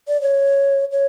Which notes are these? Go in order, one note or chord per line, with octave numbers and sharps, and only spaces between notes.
D5
C#5
C#5